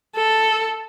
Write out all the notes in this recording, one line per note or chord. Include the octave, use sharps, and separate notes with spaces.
A4